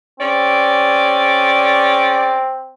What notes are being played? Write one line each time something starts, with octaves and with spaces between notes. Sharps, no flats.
C4 C#4 G#4 D5